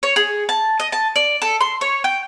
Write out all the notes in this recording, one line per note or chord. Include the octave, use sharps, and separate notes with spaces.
C#5
G#4
A5
D#5
A5
D5
A4
C6
C#5
G5